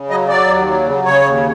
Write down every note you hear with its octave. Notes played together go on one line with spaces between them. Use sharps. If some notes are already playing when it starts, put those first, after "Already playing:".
Already playing: C#3
F#3 D#5
F#3 D5
D#2
F#3
C#3
C#3 C#5
D#2